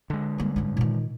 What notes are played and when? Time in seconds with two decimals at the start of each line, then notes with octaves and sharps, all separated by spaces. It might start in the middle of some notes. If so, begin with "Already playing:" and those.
0.10 D3 G#3
0.38 G3 A#3
0.56 A1 G2
0.77 A#2 D#3